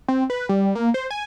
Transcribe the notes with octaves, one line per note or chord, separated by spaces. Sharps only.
C4
B4
G3
A#3
C5
G#5